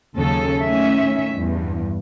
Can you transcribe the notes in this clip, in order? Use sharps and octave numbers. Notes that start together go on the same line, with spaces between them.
D#2 C#3 F#3 C#4 A4
A2 D#3 C#4 E5
E2 G2